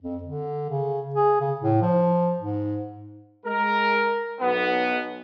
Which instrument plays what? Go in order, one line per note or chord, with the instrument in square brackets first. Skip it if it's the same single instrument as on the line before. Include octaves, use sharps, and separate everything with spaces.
[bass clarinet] F2
D3
C#3
G#4
C#3
A2
F3
G#2
[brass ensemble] G#3 A#4
B1 B3